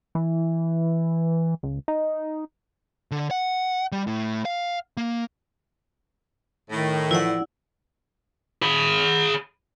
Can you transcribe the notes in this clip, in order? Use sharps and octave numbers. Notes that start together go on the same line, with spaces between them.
E3
C#2
D#4
D3
F#5
G3
A2
F5
A#3
A2 D#3
E3 F3 E4 D5 F#5
G#4 B5